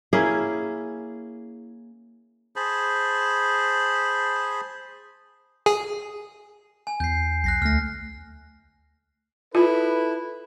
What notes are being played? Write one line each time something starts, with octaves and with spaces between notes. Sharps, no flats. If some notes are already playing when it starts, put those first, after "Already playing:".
A#3 C#4 E4 G#4
G#4 C5 A5 B5
G#4
G#5
E2 G6 C7
B1 F#6 A#6 C7
D2 A3 F6 A#6
E4 F4 A4 B4